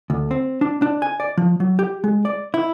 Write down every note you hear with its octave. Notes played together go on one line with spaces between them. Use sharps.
D2
C4
D4
D4
G#5
D5
F3
F#3
G4
G#3
D5
E4